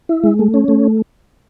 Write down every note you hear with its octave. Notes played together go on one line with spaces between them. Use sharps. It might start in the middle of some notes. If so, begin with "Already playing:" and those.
E4
G#3
A3
C#4
A3